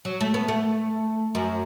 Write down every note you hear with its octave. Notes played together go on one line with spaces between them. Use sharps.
F#3
A3
B3
A3
F#2